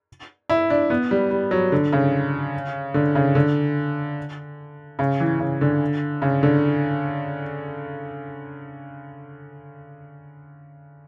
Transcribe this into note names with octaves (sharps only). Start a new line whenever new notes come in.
E4
D4
B3
G3
G3
F#3
D3
C#3
D3
C#3
D3
C#3
E3
C#3
D3
C#3
D3